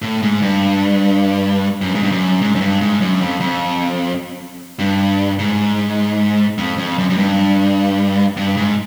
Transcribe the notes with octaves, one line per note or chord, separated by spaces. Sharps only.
A2
G#2
G2
F#2
G#2
G2
F#2
G#2
F#2
G2
G#2
F#2
F2
F2
G2
G#2
F2
F2
F#2
F#2
G2
G2
G#2